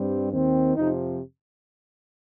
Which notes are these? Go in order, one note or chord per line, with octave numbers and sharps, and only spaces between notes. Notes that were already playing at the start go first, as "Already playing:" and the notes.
Already playing: G2 G3 C4
D#2 D#3 C4
F2 C3 F3 D#4